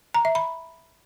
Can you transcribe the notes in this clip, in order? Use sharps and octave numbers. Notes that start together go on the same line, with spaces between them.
A#5
E5
B5